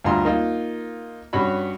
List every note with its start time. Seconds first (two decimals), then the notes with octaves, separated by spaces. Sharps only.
0.04 D2 G2 F4 A#5 C6
0.25 A#3 D#4 F4
1.33 G2 C#4 F#4 C#5 B5